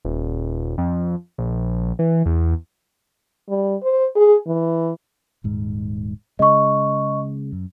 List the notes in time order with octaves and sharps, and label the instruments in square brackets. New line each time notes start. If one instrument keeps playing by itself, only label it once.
[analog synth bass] D#1
F2
A#1
E3
E2
[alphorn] G3
C5
G#4
E3
[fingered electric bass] D#1 G#2
[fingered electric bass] C#3 G#3 [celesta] D#5 C#6
[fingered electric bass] F#2